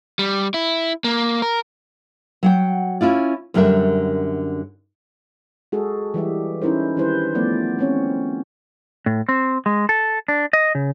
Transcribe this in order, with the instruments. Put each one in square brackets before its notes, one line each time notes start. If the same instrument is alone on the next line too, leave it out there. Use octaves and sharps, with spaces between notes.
[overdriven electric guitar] G3
E4
A#3
A#4
[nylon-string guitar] F#3 F#5 G5
C#4 E4 F4 D5
F#2 D3 G3 A#4 E5
[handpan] G#3 F#4 G#4 A4
E3 G3 G4 E5
C#4 D#4 E4 A#4 C5
D#3 G3 D4 E4 B4 C5
F3 A3 B3 D5
C4 C#4 C#5
[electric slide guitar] A2
C4
G#3
A4
D4
D#5
C#3